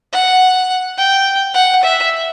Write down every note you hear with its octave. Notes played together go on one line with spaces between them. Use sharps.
F#5
G5
F#5
E5